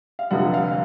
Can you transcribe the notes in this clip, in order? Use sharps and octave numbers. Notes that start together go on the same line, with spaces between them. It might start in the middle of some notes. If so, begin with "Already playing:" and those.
F5
F1 F2 D3 F#5
F5